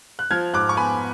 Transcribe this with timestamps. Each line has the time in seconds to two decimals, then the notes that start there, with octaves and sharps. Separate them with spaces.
0.19 F#6
0.31 F3 F6 G#6
0.53 G#2 D6 F#6
0.69 C#6
0.77 B3 G#5 B5